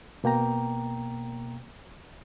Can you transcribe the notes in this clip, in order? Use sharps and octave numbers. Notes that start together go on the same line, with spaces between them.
B2 A#3 G5 A#5